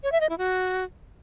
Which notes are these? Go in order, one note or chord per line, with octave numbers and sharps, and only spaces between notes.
C#5
E5
D#5
E4
F#4